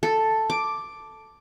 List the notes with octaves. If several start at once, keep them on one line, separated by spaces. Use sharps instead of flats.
A4
D6